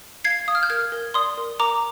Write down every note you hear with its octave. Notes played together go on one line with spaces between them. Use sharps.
F5 G#6 C7
F5 D#6
F6
G6
A#4 F6 G#6
A#4
D5 C6 D#6
A#4
A#4 A#5 D6